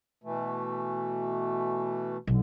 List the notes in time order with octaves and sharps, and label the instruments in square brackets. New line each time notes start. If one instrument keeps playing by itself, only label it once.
[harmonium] B2 E3 A3
[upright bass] B1 [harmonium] D3